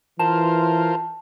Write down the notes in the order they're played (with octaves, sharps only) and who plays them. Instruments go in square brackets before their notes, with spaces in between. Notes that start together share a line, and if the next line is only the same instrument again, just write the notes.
[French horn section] E3 [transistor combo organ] F4 A#4 C5 [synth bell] A5